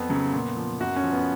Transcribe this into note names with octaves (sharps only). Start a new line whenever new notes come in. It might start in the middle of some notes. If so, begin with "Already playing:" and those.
Already playing: F2 B3
C#3 F#3
A#2
F3
F#2 F#4
C#4
F3
B3